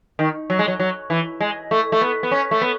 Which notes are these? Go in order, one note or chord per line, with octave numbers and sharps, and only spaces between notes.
D#3
F#3
G#3
F#3
F#3
E3
G#3
A3
A3
B3
B3
C#4
A3
B3